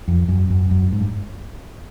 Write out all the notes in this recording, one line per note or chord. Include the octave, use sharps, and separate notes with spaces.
F2
F#2
F#2
F#2
G#2
G2